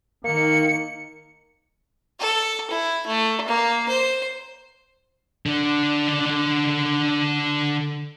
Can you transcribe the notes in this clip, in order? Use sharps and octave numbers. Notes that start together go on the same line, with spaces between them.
D#3 A#3 C#7
A4
E4
A3
A#3
C5
D3 D4